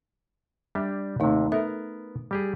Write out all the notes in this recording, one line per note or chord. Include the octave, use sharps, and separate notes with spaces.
G3 D4 G4 E5
D#2 C3 A3 D#4
B3 A4 A#4 E5
G3 G4 G#4